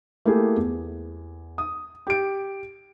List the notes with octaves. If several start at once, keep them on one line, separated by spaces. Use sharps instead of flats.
A3 A#3 E4 G4 G#4
E2
D#6
G4 D7